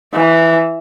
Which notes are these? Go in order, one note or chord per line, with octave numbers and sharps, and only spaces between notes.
E3